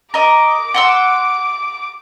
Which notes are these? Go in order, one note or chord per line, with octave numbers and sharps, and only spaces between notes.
A#4 D#5 D6
F#5 C6 E6